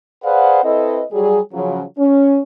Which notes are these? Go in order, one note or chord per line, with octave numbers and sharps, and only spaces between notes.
G#4 B4 C5 D5 F5 F#5
C4 E4 A4 B4 D#5
F#3 G3 G#4
C#3 F3 F#3
C#4